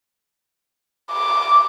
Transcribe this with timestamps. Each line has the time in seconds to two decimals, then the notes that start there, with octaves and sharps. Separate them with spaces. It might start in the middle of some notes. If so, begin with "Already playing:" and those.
1.12 D6